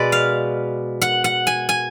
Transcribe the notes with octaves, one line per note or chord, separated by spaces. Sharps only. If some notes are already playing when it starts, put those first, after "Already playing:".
Already playing: B2 G#3 B4 D5
F5
F#5
F#5
G#5
G#5